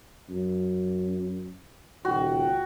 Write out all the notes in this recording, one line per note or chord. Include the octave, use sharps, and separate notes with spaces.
F#2
D#1 C#2 F#4 G5